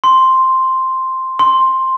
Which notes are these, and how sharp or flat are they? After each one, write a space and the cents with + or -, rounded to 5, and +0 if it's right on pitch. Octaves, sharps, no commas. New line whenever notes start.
C6 +0
C6 +5